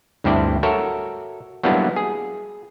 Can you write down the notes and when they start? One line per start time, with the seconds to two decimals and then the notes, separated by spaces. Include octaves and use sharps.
0.24 D2 G2 C4 E4 D5
0.63 F#4 A4 A#4 C#5 E5
1.63 F#3 G3 A#3 B3 D4 E4
1.96 G#4